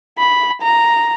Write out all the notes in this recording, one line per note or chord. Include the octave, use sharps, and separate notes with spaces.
B5
A#5